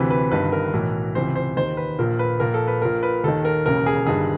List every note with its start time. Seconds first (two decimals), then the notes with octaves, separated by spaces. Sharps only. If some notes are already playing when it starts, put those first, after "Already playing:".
Already playing: D2 C3 E3 B4
0.10 B4
0.31 G1 G2 D#3 B4
0.52 A#4
0.73 B1 A2 E3
1.15 C#2 C3 E3 C5
1.36 C5
1.57 D#2 D#3 C5
1.77 B4
1.99 A#1 A#2 A#4
2.19 B4
2.40 A#1 A#2 A#4
2.54 A4
2.68 B4
2.82 A#1 A#2 A#4
3.03 B4
3.24 D#2 D#3 A4
3.45 A#4
3.65 E1 D#2 C#3 A#4
3.86 G#4
4.06 G1 G2 D#3 G#4